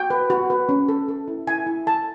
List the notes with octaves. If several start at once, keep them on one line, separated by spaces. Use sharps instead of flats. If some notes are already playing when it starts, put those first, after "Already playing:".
Already playing: F#4 G5
B4
F#4
B4
C#4
A4
A4
E4
E4 G#5
E4
A4 A5